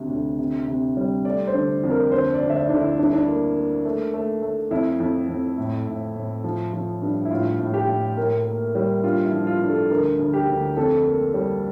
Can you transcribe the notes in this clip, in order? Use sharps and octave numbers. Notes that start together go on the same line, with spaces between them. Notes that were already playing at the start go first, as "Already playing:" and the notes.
Already playing: D2 C3
D2
C3
C3
G3
A3 D5
C5
D3
F2
A#4
D2 C5
D5
D2
E5
D5
D2 D4
E4
G2 D4
E4
D4
A#3
A#3
A3
A3
A3
F2 E4
F2
F2
A2
A2
A2
F3
F3
G2
E4
A2 F4
A2
G4
A2
A2 A#4
A#3
G3
G2 F4
E4
F3
F4
G2
A4
D2 A#4
D2
G4
D2
F2 A4
A#3
G3